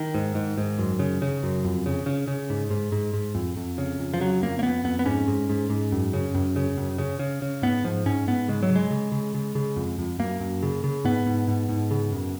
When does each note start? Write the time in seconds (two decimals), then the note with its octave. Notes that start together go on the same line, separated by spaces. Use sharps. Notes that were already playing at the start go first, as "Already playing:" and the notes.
Already playing: D#3
0.14 G#2
0.35 G#2
0.57 G#2
0.79 F#2
0.99 C#3
1.22 C#3
1.43 F#2
1.65 F2
1.86 C#3
2.06 C#3
2.28 C#3
2.50 G#2
2.70 G#2
2.92 G#2
3.14 G#2
3.35 F2
3.57 F2
3.78 C#3
3.99 F2
4.14 F3
4.20 C#3 F#3
4.42 F2 A#3
4.59 A#3
4.63 F2 B3
4.84 F2 B3
4.99 B3
5.06 G#2 C#4
5.28 G#2
5.49 G#2
5.70 G#2
5.92 F#2
6.13 C#3
6.35 F#2
6.56 C#3
6.77 F#2
6.98 C#3
7.19 C#3
7.42 C#3
7.62 G#2 B3
7.84 G#2 F3
8.06 G#2 C#4
8.27 G#2 B3
8.48 C#3 G#3
8.63 F#3
8.69 C#3
8.76 G#3
8.91 C#3
9.12 C#3
9.34 C#3
9.55 C#3
9.76 F2
9.99 F2
10.19 F#2 A#3
10.40 F#2
10.63 C#3
10.84 C#3
11.04 G#2 B3
11.26 G#2
11.48 G#2
11.69 G#2
11.91 C#3
12.13 F#2